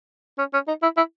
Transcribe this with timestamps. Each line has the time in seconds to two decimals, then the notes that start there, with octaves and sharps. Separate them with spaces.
0.38 C#4
0.53 C#4
0.68 D#4
0.82 E4
0.97 E4